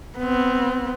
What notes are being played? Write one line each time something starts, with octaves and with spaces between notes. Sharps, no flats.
B3 C4